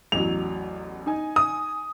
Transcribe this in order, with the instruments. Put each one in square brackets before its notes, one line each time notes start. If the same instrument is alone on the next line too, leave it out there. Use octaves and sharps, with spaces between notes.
[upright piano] A1 E2 F#3 [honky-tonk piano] F7
[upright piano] D#4 G#5
[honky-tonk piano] D#6